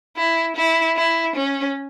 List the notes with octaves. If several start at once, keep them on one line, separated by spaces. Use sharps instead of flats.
E4
E4
E4
C#4